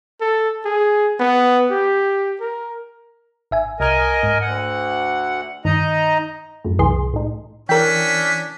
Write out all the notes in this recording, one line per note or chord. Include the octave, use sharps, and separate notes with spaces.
A4
G#4
B3
G4
A#4
G#1 E5 G#5
C2 A#4 D#5 G#5 F6
G#2
D2 F#5
G2 D#3 D#4 D#5 A#5
F#2 A2
C2 E3 G#4 C6
A2 D#4
E3 C#4 D4 A#4 G5 B6